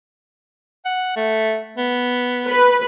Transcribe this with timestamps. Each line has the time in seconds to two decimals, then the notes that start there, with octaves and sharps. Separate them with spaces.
0.85 F#5
1.16 A3
1.77 B3
2.46 B4